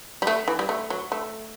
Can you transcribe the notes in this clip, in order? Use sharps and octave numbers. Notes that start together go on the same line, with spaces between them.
G3
A3
E3
G3
A3
F#3
A3